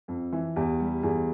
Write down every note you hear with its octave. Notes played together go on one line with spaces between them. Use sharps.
F2
E3
E2 G4
G3
E2 G#4